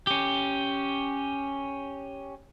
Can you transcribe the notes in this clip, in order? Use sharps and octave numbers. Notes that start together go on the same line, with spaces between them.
C#4 G4